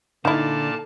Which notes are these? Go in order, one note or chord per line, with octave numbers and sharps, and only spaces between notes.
A#2 D3 D#4 E4 D5 F5 A5